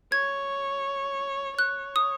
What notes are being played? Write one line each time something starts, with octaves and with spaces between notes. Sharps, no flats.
C#5 G#6
C#5 F#6
D#6